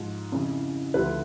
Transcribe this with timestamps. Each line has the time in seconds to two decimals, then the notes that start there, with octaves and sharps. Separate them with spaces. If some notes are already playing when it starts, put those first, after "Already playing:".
Already playing: G#2 F3
0.32 F2 C#3 E3
0.94 D2 D3 F3 B4